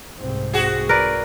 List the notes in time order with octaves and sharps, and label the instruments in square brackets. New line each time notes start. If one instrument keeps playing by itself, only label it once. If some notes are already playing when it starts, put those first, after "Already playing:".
[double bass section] C2 G#2 C4
[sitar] F#4 G#4
[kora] A#4 B4 D5